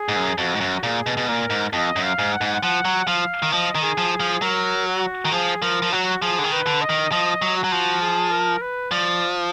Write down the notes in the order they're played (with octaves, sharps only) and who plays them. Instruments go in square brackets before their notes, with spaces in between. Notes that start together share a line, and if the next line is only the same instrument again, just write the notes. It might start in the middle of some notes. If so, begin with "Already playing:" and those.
Already playing: [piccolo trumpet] G#4
[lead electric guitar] G#2
F#2
[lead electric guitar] F2 [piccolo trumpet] F#4
[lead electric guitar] G#2
F#2
[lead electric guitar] A#2 [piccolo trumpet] G#4
[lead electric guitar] B2
B2
[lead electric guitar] A#2 [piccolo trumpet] A#4
[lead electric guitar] G#2
[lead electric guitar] F2 [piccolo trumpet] D#5
[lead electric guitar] F#2
[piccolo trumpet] F5
[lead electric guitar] G#2
[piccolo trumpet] F#5
[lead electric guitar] G#2
[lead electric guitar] F3 [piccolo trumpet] F#5
[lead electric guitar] F#3
[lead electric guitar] F3 [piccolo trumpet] F5
[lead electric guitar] D#3
[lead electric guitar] F3 [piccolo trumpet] D#5
[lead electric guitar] D#3
[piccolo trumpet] G#4
[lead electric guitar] F3
[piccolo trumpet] G#4
[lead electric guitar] F3
[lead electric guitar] F#3 [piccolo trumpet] A#4
[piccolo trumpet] F#4
[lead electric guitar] D#3
[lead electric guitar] F3 [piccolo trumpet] G#4
[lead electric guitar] F3 [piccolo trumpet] A#4
[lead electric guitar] F3
[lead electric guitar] F#3 [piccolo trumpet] F#4
[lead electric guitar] F3 [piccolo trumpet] G#4
[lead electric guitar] D3
D#3
[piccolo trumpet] B4
[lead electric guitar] D3
[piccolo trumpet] D#5
[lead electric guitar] D#3
[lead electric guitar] F3 [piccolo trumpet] D#5
[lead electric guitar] F#3
[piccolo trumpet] F#4
[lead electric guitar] F#3
F3
[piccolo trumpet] G#4
A#4
B4
[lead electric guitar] F3 [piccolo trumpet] D5